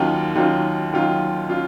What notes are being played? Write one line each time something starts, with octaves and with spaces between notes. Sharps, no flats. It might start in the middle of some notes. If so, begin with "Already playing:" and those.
Already playing: D#2 D#3 F#3 C#4 F4
D#2 D#3 F#3 C#4 F4
D#2 D#3 F#3 C#4 F4
C#4 F4